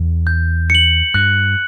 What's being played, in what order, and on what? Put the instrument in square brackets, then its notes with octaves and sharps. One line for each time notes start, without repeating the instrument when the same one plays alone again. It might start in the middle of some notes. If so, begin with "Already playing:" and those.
Already playing: [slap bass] E2
[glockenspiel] G6
C#7 F#7
[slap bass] G2 [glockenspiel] F#6